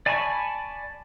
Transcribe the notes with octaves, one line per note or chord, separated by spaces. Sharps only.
D5 G#5 A5 B5 C#6